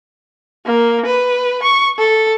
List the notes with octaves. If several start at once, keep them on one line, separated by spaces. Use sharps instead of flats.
A#3
B4
C#6
A4